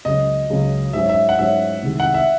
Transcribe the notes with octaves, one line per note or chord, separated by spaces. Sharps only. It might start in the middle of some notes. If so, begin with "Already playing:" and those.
C#2 C#3 F#3 D#5
C#2 C#3 F#3
G#2 F#3 C#4 E5
E5
F#5
G#2 F#3 C#4 E5
C2 C3 D#3 G#3
F#5
E5